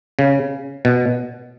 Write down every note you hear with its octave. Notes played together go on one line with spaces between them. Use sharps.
C#3
B2